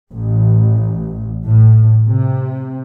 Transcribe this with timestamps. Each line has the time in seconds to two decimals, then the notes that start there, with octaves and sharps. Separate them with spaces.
0.13 A1
1.45 A2
2.07 C3